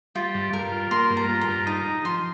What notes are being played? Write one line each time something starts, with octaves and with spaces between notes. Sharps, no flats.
G3 F4
G2
G2 A#4
F4
A#3 C6
G2
A#5
F4
A#5
G2
D#4 A#5
D#4
F3 C6